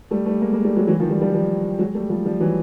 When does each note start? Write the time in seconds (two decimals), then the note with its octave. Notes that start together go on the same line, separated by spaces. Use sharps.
0.11 G3 A3
0.26 G3 A3
0.41 G#3 A#3
0.53 G#3 A#3
0.64 G3 A3
0.76 F#3 G#3
0.87 E3 F#3
0.99 D#3 F3
1.11 F3 G3
1.21 F3 G3
1.33 F3 G3
1.79 F#3 G#3
1.95 G3 A3
2.10 F3 G3
2.25 F3 G3
2.40 E3 F#3